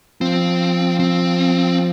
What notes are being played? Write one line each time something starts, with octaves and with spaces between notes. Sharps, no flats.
F3 C4
C4